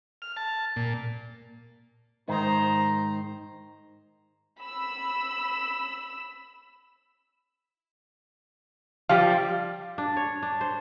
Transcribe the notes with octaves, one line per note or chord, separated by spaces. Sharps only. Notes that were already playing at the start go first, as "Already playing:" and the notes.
F6
A5
A#2
G#2 D#3 D#4 C5 A#5
B5 E6
F3 G3 G4 F5
D4
C#5
D4
C5